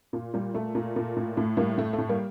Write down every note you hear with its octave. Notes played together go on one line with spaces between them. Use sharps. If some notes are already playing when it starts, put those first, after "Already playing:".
A#2
A#2 G3
A#2 A3
A#2
A#2
A2
A2 A3
A2 G3 A#3
A2 A3
A2 A3
G3 A#3